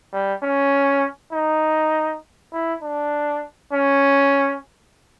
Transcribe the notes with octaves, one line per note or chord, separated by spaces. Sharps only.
G3
C#4
D#4
E4
D4
C#4